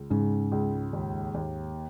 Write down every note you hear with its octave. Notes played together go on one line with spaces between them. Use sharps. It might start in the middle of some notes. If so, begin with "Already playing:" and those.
Already playing: C#2
G#2 C#3
C#2
D#2
D#2